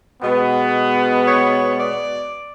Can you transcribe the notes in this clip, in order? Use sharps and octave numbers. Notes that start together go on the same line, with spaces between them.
B2 G#3 B3
C#5
D5